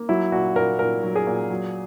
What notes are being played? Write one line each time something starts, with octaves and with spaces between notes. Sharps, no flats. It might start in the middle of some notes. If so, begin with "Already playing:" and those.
Already playing: A#3
F#3 E4
A#2 F#4
A#2 A#4
A#2 A#4
F#3
G#4
A#2
F#3